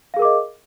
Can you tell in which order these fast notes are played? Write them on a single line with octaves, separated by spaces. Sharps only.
F5 G#4 A#4 D6 D#5